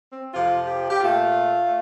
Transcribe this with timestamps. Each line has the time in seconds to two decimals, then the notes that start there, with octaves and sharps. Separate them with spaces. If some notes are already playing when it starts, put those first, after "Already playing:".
0.11 C4
0.33 F2 C3 F3 F4
0.67 G4
0.91 G4
1.00 A#2 A3 F4
1.66 A3